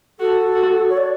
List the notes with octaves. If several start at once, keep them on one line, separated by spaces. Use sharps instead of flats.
F#4 A4
F#4
C#5
D5